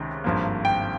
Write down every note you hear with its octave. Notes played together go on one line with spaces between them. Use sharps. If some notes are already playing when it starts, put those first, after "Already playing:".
Already playing: C#2 C3 D#3 G#3 C#4
G#1 G2 F3 A#3
G5